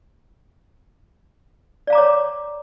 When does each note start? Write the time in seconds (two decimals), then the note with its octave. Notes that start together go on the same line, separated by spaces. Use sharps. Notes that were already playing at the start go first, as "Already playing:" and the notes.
1.87 D5
1.90 F5
1.93 A#5
1.95 D6
1.98 C#5